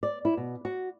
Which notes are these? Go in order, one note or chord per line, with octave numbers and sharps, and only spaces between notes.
D5
E4
B2
F#4